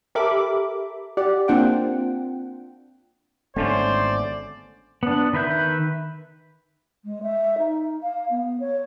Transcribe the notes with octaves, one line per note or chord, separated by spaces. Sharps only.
G4 A4 A#4 E5 B5 D6
G4 D5 F#5
A#3 C4 D4 F4 F#5 G5
G#1 D3 G#3 A3 B3 C#4 C5 D5
B3 D4
D#3 B4 E5 G6
G#3
E5
D#4
F5
B3
C#5